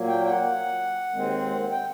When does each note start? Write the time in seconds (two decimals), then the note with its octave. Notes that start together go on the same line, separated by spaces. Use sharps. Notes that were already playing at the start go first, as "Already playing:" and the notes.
Already playing: A#2 F#3 A#3
0.08 G5
0.25 G5
0.28 F#5
1.10 D#2 D#3 G#3 C4
1.72 G5